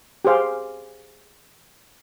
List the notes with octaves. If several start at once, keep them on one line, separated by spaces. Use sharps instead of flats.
G4 G#4 C5 F5